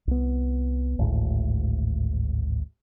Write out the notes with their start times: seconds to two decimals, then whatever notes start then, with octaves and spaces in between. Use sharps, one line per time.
0.07 C2 B3
0.99 G#1 D2 A2